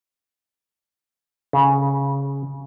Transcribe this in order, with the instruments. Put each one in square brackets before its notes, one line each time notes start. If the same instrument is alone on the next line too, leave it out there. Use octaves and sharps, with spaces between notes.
[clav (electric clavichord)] C#3